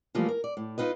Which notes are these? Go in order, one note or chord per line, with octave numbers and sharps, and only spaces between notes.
E3 F3 G3 A3 A#3 F4
A#4
D5
A2
D#4 F4 B4 D#5